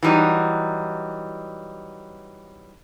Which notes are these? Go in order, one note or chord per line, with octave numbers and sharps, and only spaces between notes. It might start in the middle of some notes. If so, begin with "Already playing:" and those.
E3 F#3 G3 D#4